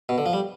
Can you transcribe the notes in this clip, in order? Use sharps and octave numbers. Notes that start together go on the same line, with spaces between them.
B2
D3
F3
G3